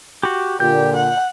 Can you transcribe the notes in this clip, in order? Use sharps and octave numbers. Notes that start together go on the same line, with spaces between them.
F#4 G4
A#2 D3 G4 G6
F#5